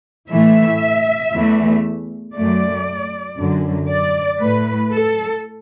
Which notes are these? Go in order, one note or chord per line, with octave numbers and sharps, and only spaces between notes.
A2 E3 A3 E5
E2 E3 A3
F#2 F#3 A3 D5
F#2 D3 F#3
D5
A2 A3 B4
A4